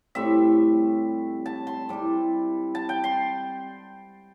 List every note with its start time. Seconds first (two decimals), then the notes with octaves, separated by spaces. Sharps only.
0.15 A2 G3 C4 E5
1.46 A5
1.67 C6
1.89 C3 G3 E4
2.75 A5
2.89 G5
3.04 C6